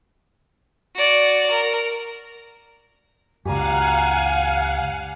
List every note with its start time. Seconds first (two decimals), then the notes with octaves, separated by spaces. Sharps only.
0.96 F#4 D5
1.51 A#4
3.45 C#2 F#2 G4 D5 F5 F#5 G#5 A#5